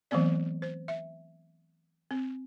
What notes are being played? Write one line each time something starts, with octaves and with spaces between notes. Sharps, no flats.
E3 F#3 A3 B3 C4 D5
C5
E5
C4